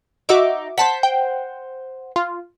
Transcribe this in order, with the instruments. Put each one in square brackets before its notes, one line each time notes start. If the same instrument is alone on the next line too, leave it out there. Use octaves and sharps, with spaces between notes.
[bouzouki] D#4 [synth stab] F#4 E5 D6
[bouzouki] C5 F#5 [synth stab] A5 B6
[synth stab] G5
F4